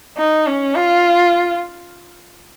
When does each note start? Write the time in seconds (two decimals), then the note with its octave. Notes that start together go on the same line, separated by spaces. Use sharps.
0.17 D#4
0.47 C#4
0.76 F4